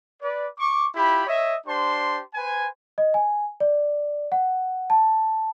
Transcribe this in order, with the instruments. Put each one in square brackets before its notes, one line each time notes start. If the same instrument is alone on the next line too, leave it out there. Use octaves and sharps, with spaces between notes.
[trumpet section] B4 D5
C#6 D6
E4 F4 G4 B5
C#5 D#5 E5
D4 G4 C5 A5 C6
B4 C5 G#5
[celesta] D#5
G#5
D5
F#5
A5